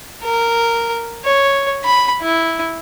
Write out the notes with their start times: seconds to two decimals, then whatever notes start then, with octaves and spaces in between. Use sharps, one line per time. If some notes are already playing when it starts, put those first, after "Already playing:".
0.24 A#4
1.25 C#5
1.84 B5
2.22 E4